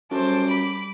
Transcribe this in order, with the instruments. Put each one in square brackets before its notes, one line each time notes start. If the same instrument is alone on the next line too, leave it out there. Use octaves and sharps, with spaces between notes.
[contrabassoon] F#2 [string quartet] G3 D6 [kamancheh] A4 C5
[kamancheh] B5